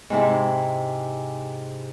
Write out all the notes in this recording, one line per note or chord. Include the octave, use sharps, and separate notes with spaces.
G#2 C3 E4